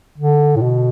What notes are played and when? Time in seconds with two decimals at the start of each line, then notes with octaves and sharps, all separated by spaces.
0.18 D3
0.56 A2
0.62 B2